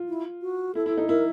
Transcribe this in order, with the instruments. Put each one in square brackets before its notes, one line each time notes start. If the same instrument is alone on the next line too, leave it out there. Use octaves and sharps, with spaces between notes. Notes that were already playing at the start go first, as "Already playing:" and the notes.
Already playing: [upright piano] F4
[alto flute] E4
F#4
[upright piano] E4 [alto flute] A4
[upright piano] E4
D#4
[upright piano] E4 [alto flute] A#4